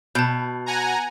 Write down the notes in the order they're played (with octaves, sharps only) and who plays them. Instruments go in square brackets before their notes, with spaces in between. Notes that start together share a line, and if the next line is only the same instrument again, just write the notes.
[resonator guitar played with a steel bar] B2 [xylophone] A5 G6
[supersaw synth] F#5 G#5 A#5